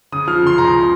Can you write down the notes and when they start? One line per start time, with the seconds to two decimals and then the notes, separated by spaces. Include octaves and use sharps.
0.12 C#3 D#6
0.27 F3 F6
0.43 C#3 C6
0.58 C#2 A#5